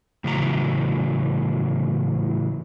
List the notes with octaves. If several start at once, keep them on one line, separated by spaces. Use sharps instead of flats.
A2 C#3 E3 F#3 D#5 A#5